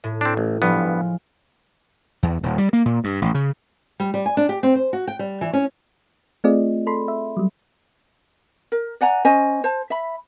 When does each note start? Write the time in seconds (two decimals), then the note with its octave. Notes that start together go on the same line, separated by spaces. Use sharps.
0.04 A2
0.21 C4 D4
0.37 A1
0.62 G2 F3 G#3 B3
2.23 E2
2.43 D#1
2.58 G3
2.73 A#3
2.86 A#2
3.04 G2
3.22 A1
3.34 C#3
4.00 G3
4.14 G3
4.26 G#5
4.37 D4
4.49 G4
4.63 C4
4.75 C5
4.93 F#4
5.07 G5
5.19 G3
5.41 E3
5.53 C#4
6.44 A3 C4 F4 G#4 D5 D#5
6.87 A4 B5 C6
7.08 E5
7.37 F#3 G3
8.72 A#4
9.01 D5 F#5 G#5 A#5
9.25 C#4 C5 D#5 G#5
9.64 C5 A5
9.90 E5 B5